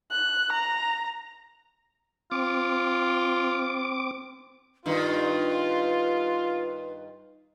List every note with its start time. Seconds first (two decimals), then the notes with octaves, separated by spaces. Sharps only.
0.12 F#6
0.53 A#5
2.32 C4 F4 D6
4.86 G2 D#3 F4 B4